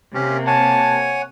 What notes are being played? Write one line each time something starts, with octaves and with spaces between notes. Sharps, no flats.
C3 A#3 C#4 G4
C#5 F#5 G#5 A5